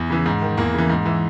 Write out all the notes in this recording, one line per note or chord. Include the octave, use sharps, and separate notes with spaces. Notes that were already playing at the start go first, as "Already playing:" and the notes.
Already playing: E2
C#3 E3
G#2
D#3
E2 A#3
C#3 E3
G#2
E3